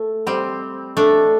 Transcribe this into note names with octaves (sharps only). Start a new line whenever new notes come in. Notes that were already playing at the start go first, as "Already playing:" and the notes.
Already playing: A3
G3 C4
A3 D4